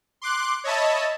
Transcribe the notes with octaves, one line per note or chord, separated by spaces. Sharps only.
C6 D6 F#6
C#5 D#5 E5 A5 B5